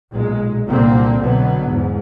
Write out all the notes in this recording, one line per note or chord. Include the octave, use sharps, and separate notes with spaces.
B1 A#2 G#3
C2 A#2 D3 G3 A#3 C4
B2 D3 F#3 B3
E2 G#2